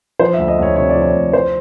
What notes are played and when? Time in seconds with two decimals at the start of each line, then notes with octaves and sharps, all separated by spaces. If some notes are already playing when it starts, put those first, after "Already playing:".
0.19 F3 C5
0.34 E5
0.38 D2
0.48 D#5
0.58 D2 C#5
0.76 C3 C#5
0.89 D5
0.95 F3
1.02 C#5
1.15 D2
1.33 F3 C5